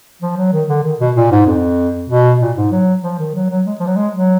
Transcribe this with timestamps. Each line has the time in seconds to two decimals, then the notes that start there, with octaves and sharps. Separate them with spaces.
0.22 F3
0.37 F#3
0.53 D#3
0.69 D3
0.84 D#3
1.00 B2
1.16 A#2
1.32 G#2
1.47 F2
2.10 B2
2.41 A#2
2.57 G#2
2.72 F#3
3.03 F3
3.19 D#3
3.34 F#3
3.50 F#3
3.66 G#3
3.80 F3
3.87 F#3
3.97 G#3
4.13 F#3